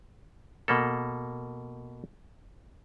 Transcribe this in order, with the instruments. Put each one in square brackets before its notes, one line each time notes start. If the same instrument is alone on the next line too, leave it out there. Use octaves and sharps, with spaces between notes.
[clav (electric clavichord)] B2 A#3 A4